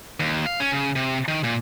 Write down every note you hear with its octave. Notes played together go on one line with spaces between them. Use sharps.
D#2
F5
C#4
C#3
C3
D#3
A#2